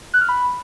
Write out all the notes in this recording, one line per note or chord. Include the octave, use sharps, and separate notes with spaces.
F#6
F6
B5